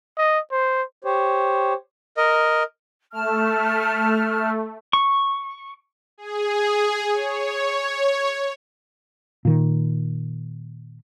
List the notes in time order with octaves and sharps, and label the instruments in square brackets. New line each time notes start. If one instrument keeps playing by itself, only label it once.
[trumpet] D#5
C5
[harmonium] G4 C5 C#5
[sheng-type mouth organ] A#4 D#5
[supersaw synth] A3 [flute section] A5 F6
[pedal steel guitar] C#6
[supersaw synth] G#4
C#5
[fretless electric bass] A#2 D#3